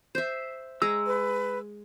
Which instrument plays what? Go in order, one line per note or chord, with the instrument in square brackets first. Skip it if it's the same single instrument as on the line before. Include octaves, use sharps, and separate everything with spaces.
[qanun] C5 E5
[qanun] G#3 A#5 [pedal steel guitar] E6
[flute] B4